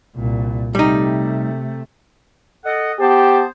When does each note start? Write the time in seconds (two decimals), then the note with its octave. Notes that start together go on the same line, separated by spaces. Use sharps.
0.16 C2 A#2
0.75 C3 G3 A3 D#4
2.65 A4 D#5 F#5
2.99 B3 G4 C5 A5